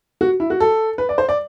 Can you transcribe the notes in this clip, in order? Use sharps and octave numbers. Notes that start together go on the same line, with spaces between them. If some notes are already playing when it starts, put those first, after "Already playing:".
F#4
E4
F#4
A4
B4
D5
C5
D5